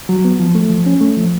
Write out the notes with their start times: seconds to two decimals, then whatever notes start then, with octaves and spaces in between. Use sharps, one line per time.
0.09 F#3
0.25 B3
0.40 F3
0.55 A3
0.70 F3
0.86 C#4
1.01 A3
1.17 F3